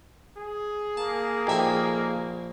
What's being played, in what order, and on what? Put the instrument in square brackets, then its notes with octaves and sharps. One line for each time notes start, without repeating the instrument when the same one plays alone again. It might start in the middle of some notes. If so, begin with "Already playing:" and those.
[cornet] G#4
[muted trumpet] A#3 [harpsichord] A5
[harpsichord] A#1 E5 G#5 [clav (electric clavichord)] D#4 G4 A4